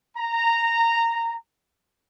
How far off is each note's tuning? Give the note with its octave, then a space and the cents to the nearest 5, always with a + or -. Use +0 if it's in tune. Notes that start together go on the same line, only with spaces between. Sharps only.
A#5 -10